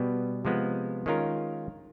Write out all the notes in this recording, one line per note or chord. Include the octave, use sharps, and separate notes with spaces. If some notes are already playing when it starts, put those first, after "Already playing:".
Already playing: B2 G3 B3
C3 F3 G#3 B3
D#3 G#3 C#4 F4 A#4